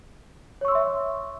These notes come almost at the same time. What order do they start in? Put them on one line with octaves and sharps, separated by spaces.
C#5 C#6 E6 C6 E5